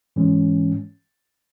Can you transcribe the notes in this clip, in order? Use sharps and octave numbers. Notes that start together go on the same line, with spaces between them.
G#2 E3 G#3 C#4